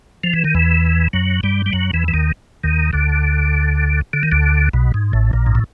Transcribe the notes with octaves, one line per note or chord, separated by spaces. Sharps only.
F3
E3
D#3
E2 E3
F#2 F#3
G2 G3
G3
F#2 F#3
E2 E3
E3
D#2 D#3
D#2 D#3
D2 D3
D3
D#3
D2 D3
B1 B2
G#2
A1 A2
A#1 A#2
G#2
A2